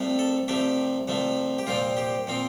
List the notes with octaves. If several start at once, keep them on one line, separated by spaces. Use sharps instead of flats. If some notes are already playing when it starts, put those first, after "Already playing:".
Already playing: C2 C3 F3 A3
A4
C2 C3 F3 A3 G4
C2 C3 F3 A3
G4
C2 A#2 F3 C4 F4
G4
A#2 F3 C4